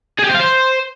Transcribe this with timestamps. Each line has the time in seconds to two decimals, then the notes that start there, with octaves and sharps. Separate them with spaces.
0.19 G#4
0.24 G4
0.29 C5
0.34 F5
0.39 C5